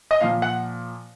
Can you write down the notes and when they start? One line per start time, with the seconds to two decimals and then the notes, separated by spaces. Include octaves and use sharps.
0.11 D#5
0.20 A#2 F3 F5
0.42 F#5